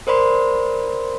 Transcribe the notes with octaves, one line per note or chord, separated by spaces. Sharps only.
A#4 C5 D5 B5 C6